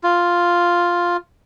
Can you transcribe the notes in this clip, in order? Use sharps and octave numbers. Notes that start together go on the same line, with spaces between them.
F4